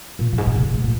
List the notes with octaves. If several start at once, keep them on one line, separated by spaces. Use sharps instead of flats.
A#2
F#2
G#2
A#2
C#3
G#2
A#2